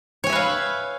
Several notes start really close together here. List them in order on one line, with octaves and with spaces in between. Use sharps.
C#5 G#5 E5 B4 F5